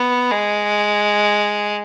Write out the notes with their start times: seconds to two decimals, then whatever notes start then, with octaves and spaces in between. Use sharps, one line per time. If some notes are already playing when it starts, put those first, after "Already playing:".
Already playing: B3
0.31 G#3